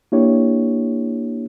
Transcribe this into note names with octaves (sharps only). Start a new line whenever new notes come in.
A#3 D4 E4 G4 C#5